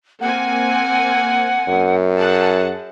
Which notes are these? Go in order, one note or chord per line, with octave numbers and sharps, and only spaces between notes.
A#3 C4 F#5 G#5
F#2
G#4 F#5 A5